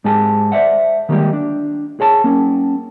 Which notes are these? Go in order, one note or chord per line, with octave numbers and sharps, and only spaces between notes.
G#2 G#3 G4 G#4 G#5 A5
C5 D5 E5 F#5
D#3 G3 G#3 A#3 G4
D4
G#4 C#5 A5
A#3 C#4